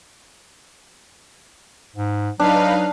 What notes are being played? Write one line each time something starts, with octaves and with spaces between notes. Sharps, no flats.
G#2
F#3 D4 D#4 B4 F5